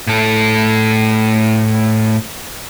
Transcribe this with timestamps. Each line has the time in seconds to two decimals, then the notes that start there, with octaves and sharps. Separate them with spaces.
0.07 A2 A4